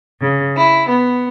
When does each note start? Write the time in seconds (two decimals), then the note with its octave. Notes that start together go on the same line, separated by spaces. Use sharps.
0.21 C#3
0.56 E4
0.89 B3